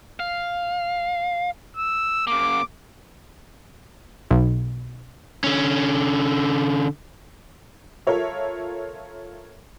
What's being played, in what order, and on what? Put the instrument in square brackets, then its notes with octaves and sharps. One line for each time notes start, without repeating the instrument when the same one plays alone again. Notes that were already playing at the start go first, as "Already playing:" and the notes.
[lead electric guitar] F5
[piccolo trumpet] E6
[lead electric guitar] C#3 A#3 [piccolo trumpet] D6
[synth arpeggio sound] B1
[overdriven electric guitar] D3 C#4
[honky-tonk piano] F4 A4 A#4 C#5 E5